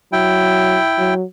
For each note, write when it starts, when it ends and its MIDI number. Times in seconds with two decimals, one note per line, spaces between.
0.12 0.79 54
0.12 1.14 64
0.12 1.14 79
0.98 1.24 54